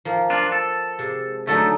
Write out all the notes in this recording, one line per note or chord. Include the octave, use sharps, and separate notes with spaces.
F3 A#3
D4 F4
A4
C3 G#3
D3 F#3 A3 D#4 A4